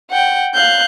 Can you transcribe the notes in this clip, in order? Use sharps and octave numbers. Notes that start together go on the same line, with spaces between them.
F#5 G5
F5 F#6 G6